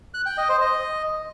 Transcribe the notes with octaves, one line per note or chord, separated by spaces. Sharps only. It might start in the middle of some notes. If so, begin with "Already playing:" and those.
F#6
G5
D#5
C5
D#5